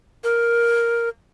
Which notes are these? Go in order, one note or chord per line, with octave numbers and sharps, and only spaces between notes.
A#4